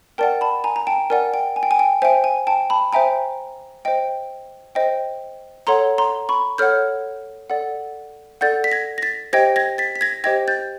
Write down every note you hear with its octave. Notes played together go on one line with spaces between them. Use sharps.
A#4 D5 F#5 G5 A5
A5 B5
G#5 A#5
A#5
G5 A5
A#4 D5 F#5 G#5
G5
G#5
G5
G#5
G5
C5 E5 G5 G#5
G#5
G5 A5
A5 B5
C5 E5 G5 G#5 A#5
C5 D#5 G5
C5 D#5 G5
A4 C#5 F#5 A#5 C6
A#5 C6
B5 C#6
A4 C#5 F#5 F6 G6
A4 D5 F#5
A4 D5 F#5 G6 A6
B6
G#6 A#6
A#6
A6 B6
G4 C5 D#5 G5 G#6 A#6
G#6 A#6
A6 B6
B6
G#6 A#6
G4 C5 D#5 G5 G#6 A#6
G6 A6